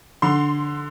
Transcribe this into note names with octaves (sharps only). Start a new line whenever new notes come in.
D3 C6